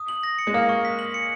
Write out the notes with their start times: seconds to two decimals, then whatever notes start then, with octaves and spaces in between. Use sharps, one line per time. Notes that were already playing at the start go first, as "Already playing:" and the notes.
Already playing: D#6
0.08 F#7
0.23 A#6
0.39 C#7
0.47 G#3
0.54 A#3 F6
0.69 C#6
0.85 B6
0.99 F#7
1.14 C#7